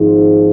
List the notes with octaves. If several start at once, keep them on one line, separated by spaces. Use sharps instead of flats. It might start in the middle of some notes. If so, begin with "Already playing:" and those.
Already playing: G#1 G#2 F3